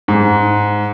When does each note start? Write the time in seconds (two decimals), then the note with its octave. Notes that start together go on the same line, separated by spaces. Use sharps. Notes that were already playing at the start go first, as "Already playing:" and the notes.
0.08 G#2